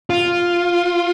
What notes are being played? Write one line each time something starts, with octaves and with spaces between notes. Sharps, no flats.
F4